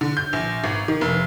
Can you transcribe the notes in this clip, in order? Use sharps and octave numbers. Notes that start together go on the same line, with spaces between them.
D3
G6
A#1
G#1
D#3
F1